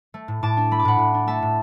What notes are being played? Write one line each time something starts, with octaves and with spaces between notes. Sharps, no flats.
A3
A2
A2 A5 D6
D4
A3 B5
D6
A2 F#5 B5
A2
D4
A3 E5 A5
A2